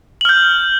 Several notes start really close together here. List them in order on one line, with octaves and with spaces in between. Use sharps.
F#7 F6 G6